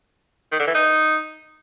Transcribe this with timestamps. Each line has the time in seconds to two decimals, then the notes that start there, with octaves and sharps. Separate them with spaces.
0.52 D#3
0.60 D3
0.67 E3
0.75 D#4